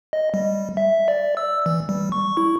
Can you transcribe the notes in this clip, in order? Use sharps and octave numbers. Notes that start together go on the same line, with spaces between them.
D#5
G3
E5
D5
E6
E3
G3
C#6
E4